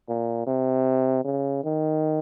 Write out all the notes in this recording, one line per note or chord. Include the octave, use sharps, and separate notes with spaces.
A#2
C3
C#3
D#3